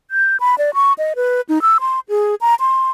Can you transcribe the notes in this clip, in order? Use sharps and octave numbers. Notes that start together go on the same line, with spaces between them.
G6
B5
D5
C#6
D#5
B4
D#4
E6
C6
G#4
A#5
C6